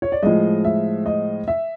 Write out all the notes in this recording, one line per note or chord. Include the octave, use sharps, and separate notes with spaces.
C#5
D5
A2 F3 G#3 D#5
E5
D#5
E5